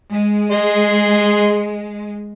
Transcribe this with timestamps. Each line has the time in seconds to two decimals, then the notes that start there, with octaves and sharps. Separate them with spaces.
0.11 G#3
0.51 G#4 D#5 C6